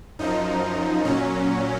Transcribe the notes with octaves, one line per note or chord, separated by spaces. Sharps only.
F#2 F3 D#4
A#2 F#3 C#4